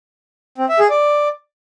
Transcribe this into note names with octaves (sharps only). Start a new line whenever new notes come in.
C4
E5
G#4
D5